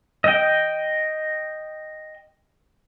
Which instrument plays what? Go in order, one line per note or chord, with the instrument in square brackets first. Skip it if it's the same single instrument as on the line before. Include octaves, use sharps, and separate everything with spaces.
[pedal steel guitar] D#5 G5